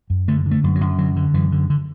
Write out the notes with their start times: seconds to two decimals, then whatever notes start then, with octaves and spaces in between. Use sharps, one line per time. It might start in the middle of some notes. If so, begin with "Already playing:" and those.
0.10 F#2
0.28 D3 A3
0.46 D3
0.51 A3
0.64 F#2
0.76 F#3
0.81 F#2
0.98 D3 F#3
1.16 D3
1.34 F#2 E3
1.52 D3
1.70 D3